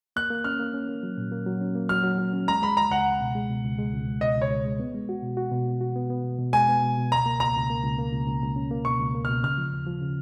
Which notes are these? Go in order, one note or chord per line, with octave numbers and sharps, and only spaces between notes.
A#3 F#6
A#3
C#4 F6
A#3
C#4
A#3
F#3
A#2
A#3
F#3
C#4
A#3
F#3 F6
F#3
F#3
C#4
G#3 A#5
G#3 B5
C#2 A#5
C#2 F#5
C#2
B2
G#3
B2
C#2
G#3
C#2
C#2
B2 D#5
C#2
C#5
C#2
G#3
B3
G#3
F#4
B2
F#4
B2
B3
F#4
B3
B3
B2
B2
G#3 G#5
B3
B2
B2
C#2 A#5
A#3
C#2 A#5
C#2
A#3
C#2
A#3
C#2
C#2
C#2
C#4
A#3
B2 C#6
C#2
A#3
B2 F6
C#3 F6
F3
D#2
F3
C#3